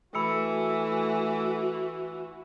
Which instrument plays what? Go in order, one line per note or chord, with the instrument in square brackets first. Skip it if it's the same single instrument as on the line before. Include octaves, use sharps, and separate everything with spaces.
[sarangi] E3 [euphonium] A3 [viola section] F#4 [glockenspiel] B5 E6 C#7